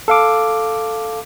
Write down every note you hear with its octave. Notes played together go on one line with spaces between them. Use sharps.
A4 F5 D6